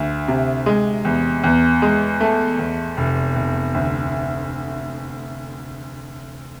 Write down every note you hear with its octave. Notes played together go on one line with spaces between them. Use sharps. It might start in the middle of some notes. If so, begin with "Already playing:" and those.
Already playing: D2
C3
G#3
E2
E2
G#3
A3
E2
F1
F1
D2